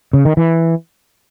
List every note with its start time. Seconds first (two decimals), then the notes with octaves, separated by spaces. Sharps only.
0.13 C#3
0.25 D#3
0.37 E3